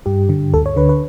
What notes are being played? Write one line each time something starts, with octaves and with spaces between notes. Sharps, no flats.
G2 G4
D3
D2 A4
C#5
D3 B4
B4